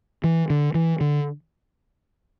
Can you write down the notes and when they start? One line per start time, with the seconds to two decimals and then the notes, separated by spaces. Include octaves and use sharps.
0.24 E3
0.50 D3
0.74 E3
1.01 D3